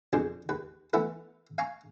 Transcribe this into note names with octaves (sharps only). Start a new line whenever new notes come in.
F2 B2 D4 G#4 C5
D#2 B4
E3 A3 B3 E4 A4 A#4
F5 G#5 A#5 C#6